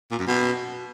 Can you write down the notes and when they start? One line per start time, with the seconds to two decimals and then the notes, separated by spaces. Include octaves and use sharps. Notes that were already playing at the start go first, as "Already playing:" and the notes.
0.11 A#2
0.19 F#2
0.27 B2